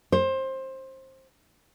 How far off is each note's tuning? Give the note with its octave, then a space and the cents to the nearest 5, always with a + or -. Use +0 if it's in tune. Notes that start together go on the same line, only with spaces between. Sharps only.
C5 +20